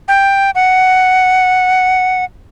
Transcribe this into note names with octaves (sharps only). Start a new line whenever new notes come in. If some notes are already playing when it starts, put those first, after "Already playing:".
G5
F#5